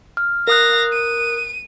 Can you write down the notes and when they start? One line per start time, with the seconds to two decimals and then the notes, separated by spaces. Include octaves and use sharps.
0.17 F6
0.47 A#4 F5 D#6 F#6 A#6
0.93 D#7